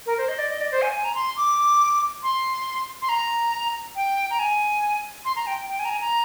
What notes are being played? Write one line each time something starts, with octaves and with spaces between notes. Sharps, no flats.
A#4
C5
D#5
D5
D#5
D5
C5
G#5
G#5
A#5
C6
D6
C6
C6
A#5
G5
A#5
G#5
C6
A#5
G5
G5
G#5
A#5
G#5
A#5